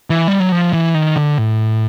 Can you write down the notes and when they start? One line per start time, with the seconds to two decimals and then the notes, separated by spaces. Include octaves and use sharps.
0.10 E3
0.28 G3
0.40 F#3
0.52 F3
0.73 E3
0.95 D#3
1.16 D3
1.38 A2